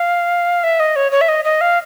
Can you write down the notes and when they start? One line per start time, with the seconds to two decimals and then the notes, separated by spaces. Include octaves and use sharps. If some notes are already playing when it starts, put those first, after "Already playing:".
Already playing: F5
0.64 E5
0.80 D#5
0.96 C#5
1.12 C#5
1.21 E5
1.29 D#5
1.45 D#5
1.61 F5